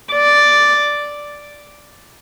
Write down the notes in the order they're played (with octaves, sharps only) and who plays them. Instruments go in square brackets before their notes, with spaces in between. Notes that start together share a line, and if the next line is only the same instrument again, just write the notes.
[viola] D5